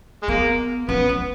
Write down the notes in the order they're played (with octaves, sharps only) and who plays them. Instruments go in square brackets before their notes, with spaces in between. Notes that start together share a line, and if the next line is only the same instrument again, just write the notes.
[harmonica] G#3
[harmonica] A#3 [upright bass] B3
[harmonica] B3 [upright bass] C#4
[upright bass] B3